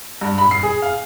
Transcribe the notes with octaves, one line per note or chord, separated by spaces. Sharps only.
G2
B5
C7
G#4
F5